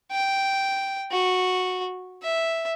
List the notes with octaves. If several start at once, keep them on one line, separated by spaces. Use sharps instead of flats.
G5
F#4
E5